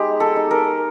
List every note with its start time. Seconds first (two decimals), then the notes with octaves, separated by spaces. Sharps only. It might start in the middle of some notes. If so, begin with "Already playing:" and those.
Already playing: G#3 B3 D#4 G4
0.20 A4
0.36 D#4
0.51 A#4